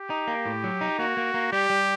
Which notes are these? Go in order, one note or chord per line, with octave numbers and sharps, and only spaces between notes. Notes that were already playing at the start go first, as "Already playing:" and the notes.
Already playing: G4
D#4
A#3
A2
F#3
D#4
A#3 F#4
A#3
A#3
G3 G4
G3